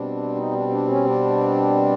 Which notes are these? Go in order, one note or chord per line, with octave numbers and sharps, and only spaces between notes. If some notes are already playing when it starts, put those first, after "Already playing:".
Already playing: B2 G3 C4 D4
D#4
D4
D4
C#4
D4